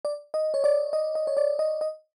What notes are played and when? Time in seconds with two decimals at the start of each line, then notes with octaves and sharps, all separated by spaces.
0.05 D5
0.34 D#5
0.54 C#5
0.64 D5
0.93 D#5
1.15 D#5
1.27 C#5
1.37 D5
1.59 D#5
1.81 D#5